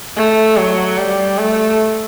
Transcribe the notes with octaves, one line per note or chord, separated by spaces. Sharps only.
A3
F#3
G3
A3